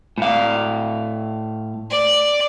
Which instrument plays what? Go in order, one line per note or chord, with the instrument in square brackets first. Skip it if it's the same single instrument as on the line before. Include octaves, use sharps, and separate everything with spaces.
[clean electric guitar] A2 F5
[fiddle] D5